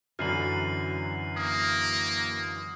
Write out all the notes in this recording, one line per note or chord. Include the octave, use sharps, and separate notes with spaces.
F#2 D3 E3 F#3 F6 C7 F#7
A#3 D#6 F6